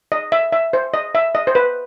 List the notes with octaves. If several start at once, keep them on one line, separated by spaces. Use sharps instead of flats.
D#5
E5
E5
C5
D#5
E5
D#5
C5
B4